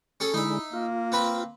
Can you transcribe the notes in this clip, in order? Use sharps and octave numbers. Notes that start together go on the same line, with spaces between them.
C#4 G#4 A4
D3 G#3 D#4 E4 E5
A#3 F4
C4 B4 B5